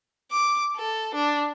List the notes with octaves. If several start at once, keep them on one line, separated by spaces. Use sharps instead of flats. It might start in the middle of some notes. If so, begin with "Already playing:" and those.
D6
A4
D4